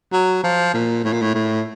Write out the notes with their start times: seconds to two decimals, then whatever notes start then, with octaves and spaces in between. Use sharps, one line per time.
0.12 F#3
0.44 F3
0.74 A#2
1.04 A2
1.13 A#2
1.22 A2
1.34 A2